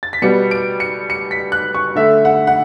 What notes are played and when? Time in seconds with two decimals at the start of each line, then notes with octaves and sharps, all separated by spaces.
0.03 A6
0.13 B6
0.22 B2 G3 B3 C#7
0.51 D7
0.80 C#7
1.10 C#7
1.31 B6
1.52 F#6
1.74 C#6
1.95 D3 A3 E5
2.25 F#5
2.47 F#5